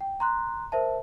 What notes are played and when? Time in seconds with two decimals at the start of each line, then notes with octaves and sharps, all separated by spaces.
0.01 G5
0.20 A#5 C6 F#6
0.72 A#4 C5 E5 A5